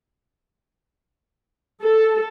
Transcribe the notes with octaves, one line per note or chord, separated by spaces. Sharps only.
A4